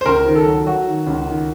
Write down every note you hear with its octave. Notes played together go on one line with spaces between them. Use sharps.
C5
C#2 A#4
D#3
A4
F#3
F#3 F#4
D#3
C#2
D#3